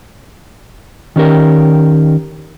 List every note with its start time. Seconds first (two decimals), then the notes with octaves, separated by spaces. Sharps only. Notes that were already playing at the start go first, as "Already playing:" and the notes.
1.16 D#3 C#4 G4 A#4